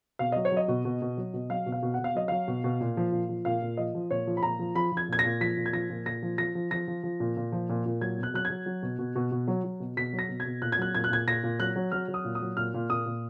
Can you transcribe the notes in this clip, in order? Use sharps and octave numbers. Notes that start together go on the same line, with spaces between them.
B2 F5
F#3 D#5
C#5
F#3
D#5
B2
B2
B2
F#3
B2
F#3 F5
B2
F5
B2
F#5
B2
F5
F#3 D#5
F#3 F5
B2
B2
A#2
F3
A#2
F3
A#2 F5
A#2
F3 D#5
F3
A#2 C#5
F3
B5
A#2 A#5
F3
F3 B5
F3
G#6
A#2 G#6
A#6
A#2
F3 B6
A#2
G#6
F3 A#6
A#2
A#2 A#6
F3
F3 A#6
F3
F3 A#6
F3
F3
A#2
A#2
F3
A#2
A#2
F#3 G#6
B2
F#6
F#3 F#6
G#6
F#3
F#3
B2
B2
B2
B2
F#3
F#3
B2
B2 B6
F#3
A#6
B2
G#6
B2
A#2 F#6
G#6
F#3 F#6
A#2 G#6
F#6
A#2 G#6
A#2 A#6
A#2
F#3 F#6
F#3
F#3 F6
F#3
D#6
A#2
D#6
F#3
A#2 F6
A#2
A#2 D#6
A#2